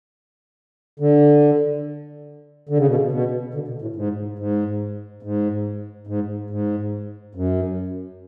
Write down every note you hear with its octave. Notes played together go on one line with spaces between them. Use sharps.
D3
D3
C#3
B2
C#3
B2
D3
B2
A2
G#2
G#2
G#2
G#2
G#2
F#2